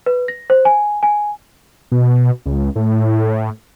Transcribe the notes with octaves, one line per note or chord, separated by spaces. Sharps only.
B4
A#6
C5
G#5
G#5
B2
C#2
A2